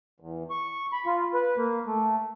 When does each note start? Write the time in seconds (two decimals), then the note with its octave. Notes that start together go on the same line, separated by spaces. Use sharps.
0.20 E2
0.50 C#6
0.93 B5
1.06 F4
1.34 B4
1.57 A#3
1.86 A3